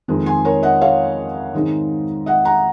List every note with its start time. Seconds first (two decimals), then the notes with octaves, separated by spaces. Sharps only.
0.08 F2 D#3 G#3 C4 D#4
0.26 G#5 C6
0.45 A#4 C#5
0.63 D#5 F#5
0.81 C#5 F5
1.53 G#2 D#3 G#3 C4 D#4
2.26 D#5 F#5
2.45 F#5 A#5